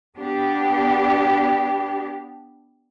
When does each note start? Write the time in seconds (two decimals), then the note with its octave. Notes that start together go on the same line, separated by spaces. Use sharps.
0.16 B3 D4 G4